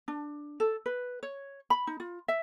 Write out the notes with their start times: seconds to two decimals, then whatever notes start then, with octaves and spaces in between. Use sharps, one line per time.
0.08 D4
0.60 A4
0.86 B4
1.23 C#5
1.70 B5
1.87 D#4
2.00 F4
2.28 E5